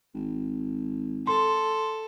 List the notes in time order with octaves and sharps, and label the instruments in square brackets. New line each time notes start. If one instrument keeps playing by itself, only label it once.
[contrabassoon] G#1
[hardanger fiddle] A4 [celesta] C6